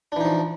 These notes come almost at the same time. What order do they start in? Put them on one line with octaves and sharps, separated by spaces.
D4 E3 D#4 F3